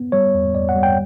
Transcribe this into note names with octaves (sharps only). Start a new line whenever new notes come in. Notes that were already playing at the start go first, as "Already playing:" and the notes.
Already playing: B3
G3 C#5
E2
E2 D5
F#5
G3
G5